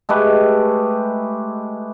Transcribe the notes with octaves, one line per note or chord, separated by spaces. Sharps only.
G#3 A3 G4 B4